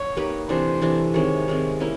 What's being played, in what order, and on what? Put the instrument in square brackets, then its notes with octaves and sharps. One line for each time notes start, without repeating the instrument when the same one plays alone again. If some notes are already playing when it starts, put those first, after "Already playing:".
Already playing: [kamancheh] C#5
[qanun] A#3 D#4 G4 B4
[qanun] C3 E3 A3 D4 [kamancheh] C5
[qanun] C3 E3 A3 D4
[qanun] D#3 G#3 C4 [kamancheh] C#5
[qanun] D#3 G#3 C4
A#3 C#4 E4